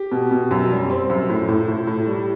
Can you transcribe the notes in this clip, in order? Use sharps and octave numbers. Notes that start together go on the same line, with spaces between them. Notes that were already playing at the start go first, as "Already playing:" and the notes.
Already playing: G4
B2
B2
F#2
G3
C4
F#2
A2
A2
A2
A2
G3